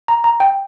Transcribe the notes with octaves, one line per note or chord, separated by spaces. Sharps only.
A#5
A#5
G5